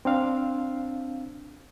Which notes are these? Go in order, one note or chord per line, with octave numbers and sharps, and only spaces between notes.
C4 D4 F5